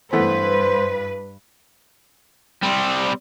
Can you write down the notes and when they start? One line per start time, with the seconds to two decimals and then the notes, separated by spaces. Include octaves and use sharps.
0.13 G2 E3 A3 B3 B4 C5
2.63 G3 C4